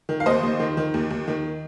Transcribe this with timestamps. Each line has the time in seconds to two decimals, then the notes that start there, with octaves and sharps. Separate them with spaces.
0.09 D#3
0.20 F5
0.26 D#2 C5 D#5
0.43 D#2
0.60 D#3
0.77 D#3
0.94 D#2
1.10 D#2
1.28 D#3